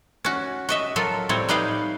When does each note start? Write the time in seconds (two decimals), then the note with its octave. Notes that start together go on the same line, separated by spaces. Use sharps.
0.25 C#4 F#4
0.69 F#4 D#5 E5
0.96 F#3 F4 A4 A#4
1.29 A2 G3 C4 C#5
1.49 G3 D#4 B4 D#5 F5 G5